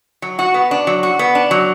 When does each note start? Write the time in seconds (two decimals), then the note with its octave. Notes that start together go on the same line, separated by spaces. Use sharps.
0.22 F#3
0.39 F#4
0.54 B3
0.71 D4
0.87 F#3
1.03 F#4
1.19 B3
1.35 D4
1.51 F#3